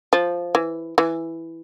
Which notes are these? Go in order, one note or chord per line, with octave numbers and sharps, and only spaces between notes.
F3
E3
E3